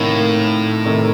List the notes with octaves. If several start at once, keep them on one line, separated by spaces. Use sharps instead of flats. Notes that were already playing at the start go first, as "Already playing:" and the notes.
Already playing: A2 C3 D#3 A#3
C3 D#3 A3